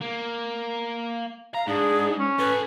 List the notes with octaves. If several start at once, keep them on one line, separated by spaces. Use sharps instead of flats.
A#3
F5 A#5
G#2 D4 G#4
C#4
A4 B4 G#5